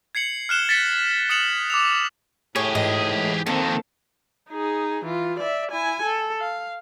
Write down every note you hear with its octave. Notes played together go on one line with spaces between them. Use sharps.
G#6 C7 C#7 F#7
F6 F#6 E7 G7
A6 B6 C#7
D#6 C#7 E7 F#7
D6 E6 F7
A2 G4 G#4 C#5
G#2 E3 D#5
F2 D#3 A#3 C4 A4
D#4 G#4
E3 F4
D5 E5
E4 G#5
A4
F5